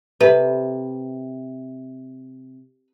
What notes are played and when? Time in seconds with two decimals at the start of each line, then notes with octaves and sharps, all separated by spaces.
0.21 C3 B4